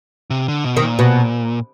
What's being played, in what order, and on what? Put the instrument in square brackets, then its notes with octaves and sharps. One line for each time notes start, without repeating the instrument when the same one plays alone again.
[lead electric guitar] C3
D3
B2
[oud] D#3
[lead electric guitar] A#2
[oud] B2